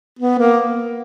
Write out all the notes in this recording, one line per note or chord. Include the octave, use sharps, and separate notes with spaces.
B3
A#3